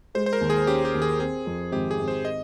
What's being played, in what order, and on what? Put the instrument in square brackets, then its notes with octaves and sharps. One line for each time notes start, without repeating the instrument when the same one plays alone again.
[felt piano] G#3 [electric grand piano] C5
[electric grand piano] C5
A#4
[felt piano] D#2
[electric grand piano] G#4
[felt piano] C#4 [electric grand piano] G4
[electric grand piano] G4
[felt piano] D#2
[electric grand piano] G#4
[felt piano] C4 [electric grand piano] G#4
[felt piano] F2
[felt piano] G#1 [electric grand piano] G4
[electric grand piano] G#4
[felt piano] G#1
[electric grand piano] C5
D#5